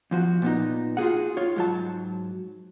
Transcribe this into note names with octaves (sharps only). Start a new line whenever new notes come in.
E2 F3 F#4
A#2 B3 D#4
F4 F#4 G#4 F#5
F4 C#5
G#2 F#3 A5